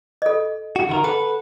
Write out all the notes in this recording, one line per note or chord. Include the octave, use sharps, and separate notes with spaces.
A4 D#5
F#4
D#3 E4 A#4
A4 B4 F#5